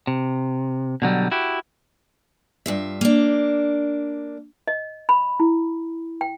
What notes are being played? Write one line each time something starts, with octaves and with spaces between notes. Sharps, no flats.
C3
B2 D3 F#3 G3
E4 F#4 G4
G2 F4 E5
A#3 D4
D#5
B5
E4
G5